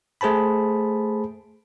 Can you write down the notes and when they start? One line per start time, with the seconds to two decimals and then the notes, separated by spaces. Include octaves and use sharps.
0.21 A3 G#4 C5 A5 B5